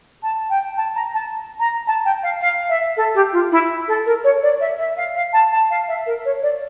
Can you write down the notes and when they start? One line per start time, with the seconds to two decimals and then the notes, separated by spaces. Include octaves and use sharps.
0.23 A5
0.50 G5
0.77 A5
0.96 A#5
1.14 A5
1.60 A#5
1.87 A5
2.05 G5
2.23 F5
2.41 F5
2.69 E5
2.97 A4
3.15 G4
3.33 F4
3.52 E4
3.88 A4
4.06 A#4
4.24 C#5
4.43 D5
4.61 E5
4.79 E5
4.97 F5
5.16 F5
5.33 A5
5.52 A5
5.70 F5
5.88 E5
6.06 A#4
6.25 C#5
6.43 D5